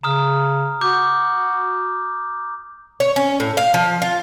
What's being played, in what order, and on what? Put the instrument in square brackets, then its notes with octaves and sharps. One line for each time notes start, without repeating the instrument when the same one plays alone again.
[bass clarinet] C#3 [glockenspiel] A#5 D#6 F6
[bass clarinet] F#4 [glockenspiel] D6 G6
[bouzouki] C#5
C#4
A2
F5
F3
F4